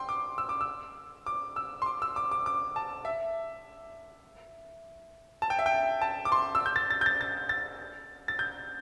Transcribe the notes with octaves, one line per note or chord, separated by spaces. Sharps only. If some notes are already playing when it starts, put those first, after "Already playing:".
Already playing: G5 C6
D6
E6
D6
E6
D6
E6
C6
D6
E6
D6
D6
D6
A5
E5
A5
G5
E5
G5
A5
D6
C6
E6
G6
A6
A6
G6
A6
A6
A6
A6
G6